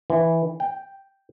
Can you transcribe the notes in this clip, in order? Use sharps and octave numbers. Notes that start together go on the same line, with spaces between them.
E3
G5